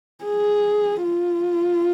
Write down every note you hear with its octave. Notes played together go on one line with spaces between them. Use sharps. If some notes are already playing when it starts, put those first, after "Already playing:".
G#4
F4